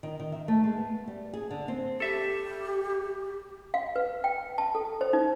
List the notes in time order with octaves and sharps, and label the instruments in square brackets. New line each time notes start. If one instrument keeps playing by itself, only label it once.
[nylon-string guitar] D#3
D#3
E5
A3
G#3
B3
G3
G#4
D3
C4
[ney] G4 [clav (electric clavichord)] A4 E5
[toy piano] F5
B4
G5
A5
A4
C5
D#4